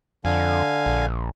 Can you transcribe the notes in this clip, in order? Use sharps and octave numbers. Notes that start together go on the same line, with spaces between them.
F2 D3 F5 G#5
A#1